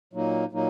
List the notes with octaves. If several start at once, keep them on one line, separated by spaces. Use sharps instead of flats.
A#2 F#3 A#3 D#4
A#2 F#3 A#3 D#4